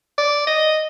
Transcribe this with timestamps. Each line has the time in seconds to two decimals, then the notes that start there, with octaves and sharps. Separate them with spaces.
0.18 D5
0.47 D#5